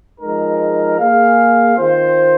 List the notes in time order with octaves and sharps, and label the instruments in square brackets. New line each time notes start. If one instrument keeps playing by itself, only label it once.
[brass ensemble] F3 G#3 D#4 A#4
A#3 G#4 F5
D#3 C4 F4 C5